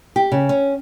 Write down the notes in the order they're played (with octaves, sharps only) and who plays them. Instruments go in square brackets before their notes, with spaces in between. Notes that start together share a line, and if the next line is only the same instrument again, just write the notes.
[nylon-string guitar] G4
C#3
C#4